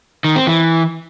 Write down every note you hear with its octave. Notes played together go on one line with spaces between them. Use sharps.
D#3
C4
E3